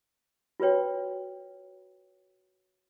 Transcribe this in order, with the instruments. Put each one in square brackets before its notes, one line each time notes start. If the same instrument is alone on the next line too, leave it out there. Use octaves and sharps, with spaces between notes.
[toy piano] F4 F#4 B4 C#5 G5